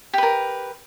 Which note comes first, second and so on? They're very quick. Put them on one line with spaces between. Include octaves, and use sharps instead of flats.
G4 B4 A#4